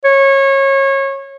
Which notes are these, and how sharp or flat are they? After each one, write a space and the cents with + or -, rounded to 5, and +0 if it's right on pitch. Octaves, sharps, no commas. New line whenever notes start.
C#5 -25